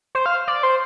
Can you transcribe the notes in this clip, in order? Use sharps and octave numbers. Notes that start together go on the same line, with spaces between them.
C5
F5
D5
C5